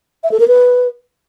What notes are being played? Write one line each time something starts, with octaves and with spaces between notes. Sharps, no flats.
E5
A4
A#4
B4